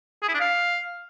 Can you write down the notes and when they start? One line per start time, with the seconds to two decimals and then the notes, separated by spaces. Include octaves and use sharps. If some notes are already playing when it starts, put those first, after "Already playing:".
0.23 G#4
0.28 E4
0.34 D4
0.40 F5